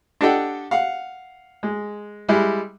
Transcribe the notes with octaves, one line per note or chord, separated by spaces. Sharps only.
D4 G4 A4 D#5 F#5 G5
F5 F#5
G#3
G3 G#3 E4 G4